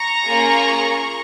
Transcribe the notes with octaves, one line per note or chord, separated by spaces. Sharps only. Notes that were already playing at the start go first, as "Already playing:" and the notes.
Already playing: A#5 C#6
A#3 C#4 F4 G#4